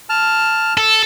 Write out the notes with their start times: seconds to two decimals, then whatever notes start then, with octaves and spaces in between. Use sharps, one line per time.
0.09 A5 F6
0.77 A4